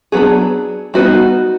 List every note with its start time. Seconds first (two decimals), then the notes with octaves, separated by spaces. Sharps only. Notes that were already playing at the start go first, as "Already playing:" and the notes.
0.12 F#3 B3 D4 G#4
0.94 G3 B3 D#4 F#4